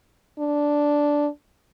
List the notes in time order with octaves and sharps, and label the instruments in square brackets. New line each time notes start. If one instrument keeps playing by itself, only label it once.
[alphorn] D4